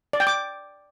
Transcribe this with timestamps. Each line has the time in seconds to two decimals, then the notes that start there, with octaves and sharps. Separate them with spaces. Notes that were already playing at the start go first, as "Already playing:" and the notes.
0.13 D5
0.20 G5
0.27 D6